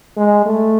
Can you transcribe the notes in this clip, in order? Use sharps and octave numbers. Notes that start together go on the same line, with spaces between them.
G#3
A3